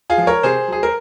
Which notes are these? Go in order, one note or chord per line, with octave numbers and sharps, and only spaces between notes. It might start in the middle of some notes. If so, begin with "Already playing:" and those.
F4 G#4
F3
A#4 C#5
C3 G#4 C5
F#3 G#4
A#4